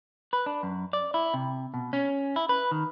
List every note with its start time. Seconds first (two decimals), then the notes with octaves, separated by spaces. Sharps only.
0.33 B4
0.46 D4
0.63 F#2
0.93 D5
1.14 E4
1.34 C3
1.74 B2
1.93 C#4
2.36 E4
2.49 B4
2.71 D#3